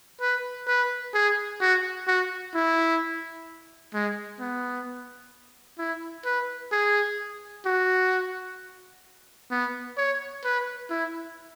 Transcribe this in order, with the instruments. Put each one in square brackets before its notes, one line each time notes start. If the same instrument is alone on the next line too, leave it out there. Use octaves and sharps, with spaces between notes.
[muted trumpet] B4
B4
G#4
F#4
F#4
E4
G#3
B3
E4
B4
G#4
F#4
B3
C#5
B4
E4